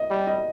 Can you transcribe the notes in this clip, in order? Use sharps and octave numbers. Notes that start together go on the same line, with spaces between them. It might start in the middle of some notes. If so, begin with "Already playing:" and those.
Already playing: D#5
G3
D#5